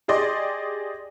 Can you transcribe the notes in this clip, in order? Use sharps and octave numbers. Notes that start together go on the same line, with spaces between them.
G4 G#4 D5 D#5 C6 D6